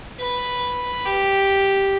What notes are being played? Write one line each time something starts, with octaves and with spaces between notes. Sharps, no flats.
B4
G4